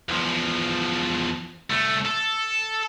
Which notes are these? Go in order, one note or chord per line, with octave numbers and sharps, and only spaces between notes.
E2 F3
C2 A3
A4